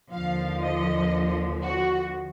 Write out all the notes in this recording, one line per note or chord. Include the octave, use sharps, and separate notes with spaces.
D#2 D3 F3 F5
D#5
F#4